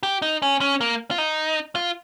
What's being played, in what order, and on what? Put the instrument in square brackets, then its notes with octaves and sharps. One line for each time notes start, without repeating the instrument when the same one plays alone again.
[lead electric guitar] G4
D#4
C#4
C#4
A#3
F4
D#4
F4